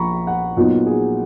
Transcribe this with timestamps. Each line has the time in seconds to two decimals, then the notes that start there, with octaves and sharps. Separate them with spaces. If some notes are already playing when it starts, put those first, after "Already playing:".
Already playing: A#1 A#2 A#3 A#5 B5 C#6
0.27 F#5
0.57 A#2 F#3 B3 D#4
0.86 G#4